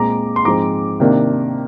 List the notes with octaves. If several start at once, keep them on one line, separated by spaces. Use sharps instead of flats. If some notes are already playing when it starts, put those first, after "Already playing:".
Already playing: A#2 G#3 C4 A#5 D6
C6
G#2 F3 G#3 C4 A#5 D6
C3 D#3 A#3 D4